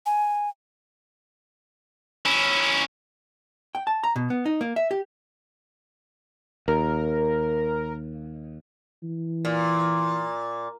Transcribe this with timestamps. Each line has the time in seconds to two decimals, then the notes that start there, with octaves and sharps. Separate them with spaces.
0.06 G#5
2.26 C#4 E4
3.75 G5
3.87 A5
4.04 A#5
4.16 B2
4.30 B3
4.45 D#4
4.61 A#3
4.76 E5
4.91 G4
6.68 D#2 A#4
9.03 E3
9.45 A#2